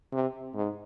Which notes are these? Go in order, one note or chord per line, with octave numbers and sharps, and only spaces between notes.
C3
G#2